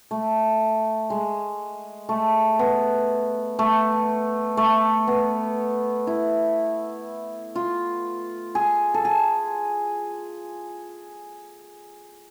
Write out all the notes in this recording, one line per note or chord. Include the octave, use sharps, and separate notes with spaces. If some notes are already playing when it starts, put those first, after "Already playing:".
A3
G#3
A3
B3
A3
A3
B3
E4
F4
G#4
A4
G#4